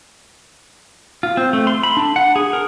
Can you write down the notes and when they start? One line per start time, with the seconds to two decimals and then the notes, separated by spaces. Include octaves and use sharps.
1.23 F4
1.37 C4
1.53 A3
1.67 C6
1.83 B5
1.97 D4
2.16 F#5
2.36 G#4
2.53 A#4